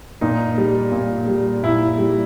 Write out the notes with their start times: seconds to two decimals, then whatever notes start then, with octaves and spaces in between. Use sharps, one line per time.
0.21 A#2 D#4
0.58 G3
0.92 A#2
1.27 G3
1.63 A#2 E4
1.98 G3